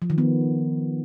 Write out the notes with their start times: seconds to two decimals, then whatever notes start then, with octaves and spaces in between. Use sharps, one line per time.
0.02 F3
0.10 D#3
0.18 B3